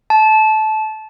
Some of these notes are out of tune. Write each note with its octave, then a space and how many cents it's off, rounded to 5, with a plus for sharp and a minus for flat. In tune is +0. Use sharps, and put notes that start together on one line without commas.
A5 -20